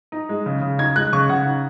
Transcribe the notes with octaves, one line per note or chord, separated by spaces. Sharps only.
D#4
G#3
C#3
C#3
D#4 G#6
G#3 F#6
C#3 C#6
C#3 F#5
D#4